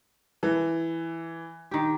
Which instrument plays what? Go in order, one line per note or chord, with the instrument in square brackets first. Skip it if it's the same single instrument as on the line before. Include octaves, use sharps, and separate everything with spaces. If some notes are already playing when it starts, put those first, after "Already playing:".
[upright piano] E3
[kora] D#3 G4